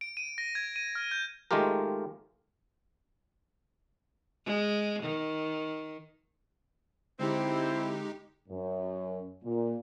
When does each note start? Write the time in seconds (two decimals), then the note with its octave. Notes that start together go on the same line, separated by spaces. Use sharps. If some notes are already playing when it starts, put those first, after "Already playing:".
0.01 D7
0.17 D#7
0.38 A#6
0.55 G#6
0.76 D#7
0.95 F6
1.11 G6
1.51 D#3 G#3 A3 F4 G4 A#4
4.46 G#3
5.03 D#3
7.19 D3 G#3 C4 D#4 E4 G4
8.48 F#2
9.42 A#2